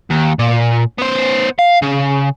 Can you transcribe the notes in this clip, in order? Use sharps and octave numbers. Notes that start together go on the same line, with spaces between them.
D#2
A#2
B3 C5
F5
C#3